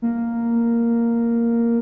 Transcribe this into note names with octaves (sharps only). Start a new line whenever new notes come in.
A#3